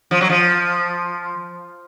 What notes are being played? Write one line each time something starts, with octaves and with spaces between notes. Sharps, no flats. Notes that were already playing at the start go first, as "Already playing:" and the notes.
F3
F#3
F3